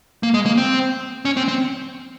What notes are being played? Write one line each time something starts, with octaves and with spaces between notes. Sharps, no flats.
A#3
G#3
A#3
C4
C#4
C4
C4